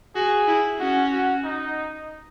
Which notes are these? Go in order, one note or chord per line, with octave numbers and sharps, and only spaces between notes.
F#4 G#4
E4
C#4 F#4
F#4
D#4